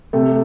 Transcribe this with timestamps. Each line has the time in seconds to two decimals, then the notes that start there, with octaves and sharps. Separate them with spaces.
0.13 C3 A3